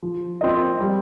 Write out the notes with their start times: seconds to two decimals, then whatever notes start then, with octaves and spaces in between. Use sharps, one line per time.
0.02 F3
0.41 C4 F4 A#4 D#5
0.80 G3